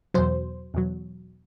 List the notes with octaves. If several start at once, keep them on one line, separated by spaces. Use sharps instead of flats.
E2 B2 F#3 C5
E2 B2 F#3